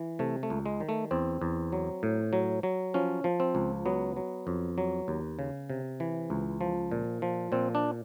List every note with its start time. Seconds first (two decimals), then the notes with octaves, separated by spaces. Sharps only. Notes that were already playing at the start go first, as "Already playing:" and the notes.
Already playing: E3
0.19 C3 A3
0.43 A3
0.50 C#2
0.66 G#3
0.80 D#3
0.89 A3
1.11 E2 C4
1.42 E2
1.72 F#3
2.03 A2
2.33 F#3
2.63 F#3
2.94 F3 C#4
3.24 F3
3.40 C4
3.55 C#2
3.86 F#3 B3
4.16 F#3
4.47 F2
4.78 F#3
5.08 D#2
5.39 C#3
5.70 C3
6.00 E3
6.30 C#2
6.61 F3
6.91 A#2
7.22 F3
7.52 A#2 C4
7.75 D4